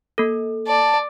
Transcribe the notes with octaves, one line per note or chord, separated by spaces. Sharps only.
A#3 A4
D5 A5